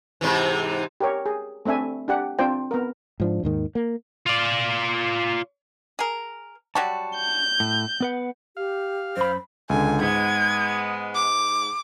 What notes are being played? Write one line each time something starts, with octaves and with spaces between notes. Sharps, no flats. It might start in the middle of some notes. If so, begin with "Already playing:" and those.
G#2 C3 E3
G4 A#4 C#5
G#4
A3 C4 D4 E5 G#5
D4 G4 F#5
C4 D4 F4 C5 G5
B3 A#4
G#2 F3 D4
D#2 G#2 D#3
A#3
F4 D5
G#4 A#4
F#3 G3 F#4 A5
G6
A2
B3 B4 F#5
G4 F5
F#2 C5 B5
C#2 D3 G#5
G#2 G#3 B3 G#6
D6